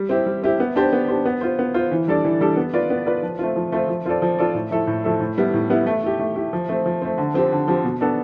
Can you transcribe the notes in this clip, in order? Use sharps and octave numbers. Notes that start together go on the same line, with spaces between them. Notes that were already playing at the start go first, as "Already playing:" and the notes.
Already playing: G3
C4 E4 G4
G3
C4 E4 G4
B3
D4 G4 C5
B3
D4 G4 C5
B3
F4 C5
B3
F4 C5
E3
G3 D4 A4 D5
E3
G3 D4 A4 D5
B3
F4 B4 D5
B3
F4 B4 D5
F3
A3 C4 F4
F3
A3 C4 F4
F3
C4 F4 A4 D5
F3
C4 F4 A4 D5
A2
F3 A3 E4 A4
A2
F3 A3 E4 A4
A2
G3 B3 E4
A2
G3 B3 E4
A3
E4 G4
A3
E4 G4
F3
A3 C4
F3
A3 C4
D3
F3 C4 G4
D3
F3 C4 G4
B2
B3 D4 A4